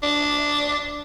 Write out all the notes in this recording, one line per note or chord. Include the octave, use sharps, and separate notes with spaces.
D4